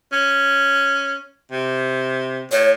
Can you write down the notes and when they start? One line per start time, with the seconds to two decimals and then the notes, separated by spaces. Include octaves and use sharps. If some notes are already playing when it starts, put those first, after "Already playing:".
0.13 C#4
1.52 C3
2.52 A2 C#5